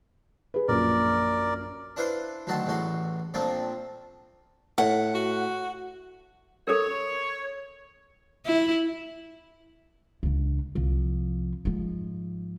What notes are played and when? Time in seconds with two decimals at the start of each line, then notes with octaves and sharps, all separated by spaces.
0.54 G#4 B4
0.68 A#1 F#2 A#2 A#4 D5
1.97 D4 E4 B4 C5 F5 C6
2.47 D2 D#3 F#3 F#4 A5 C6
2.66 A1 E2 A2 F#4 C6
3.34 A#2 F3 A3 A#3 C4 D4
4.78 A2 F#5
5.14 F#4
6.68 A4 A#4 C#5
8.46 E4
10.23 C#2 D4
10.75 C2 F3
11.65 G#2 F3